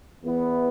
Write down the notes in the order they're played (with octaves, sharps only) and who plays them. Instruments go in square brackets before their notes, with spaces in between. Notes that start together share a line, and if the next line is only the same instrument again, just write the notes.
[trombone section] E2 E3 B3 E4